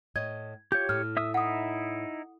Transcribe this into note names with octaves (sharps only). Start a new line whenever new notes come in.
A2 C#5 D#5 G#6
F4 G4 C#5 G6
A2 F6
E5 D#6 E6
D#4 E4 E5 F#5 D#6